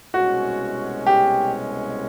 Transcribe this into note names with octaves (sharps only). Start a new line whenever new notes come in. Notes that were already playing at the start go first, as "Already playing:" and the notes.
C2 B2 G#3 C#4 F#4
G4